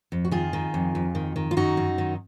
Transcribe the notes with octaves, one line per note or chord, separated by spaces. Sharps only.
F2
F#4
D#3 F4 G#4
D#3
F2
F2
D#3
D#3
F4
F#2 D#4 F#4
F#2
D#3